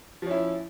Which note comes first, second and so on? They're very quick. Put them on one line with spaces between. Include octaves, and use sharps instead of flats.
F3 C#4 E4